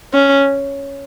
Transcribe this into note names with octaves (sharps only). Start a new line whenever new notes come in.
C#4